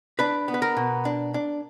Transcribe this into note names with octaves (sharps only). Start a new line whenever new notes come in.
D4 B4
B3
B4
A#4
B2
D4
D4